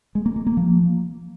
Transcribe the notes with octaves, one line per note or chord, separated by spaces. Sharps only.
G#3
A#3
A#3
A#3
F3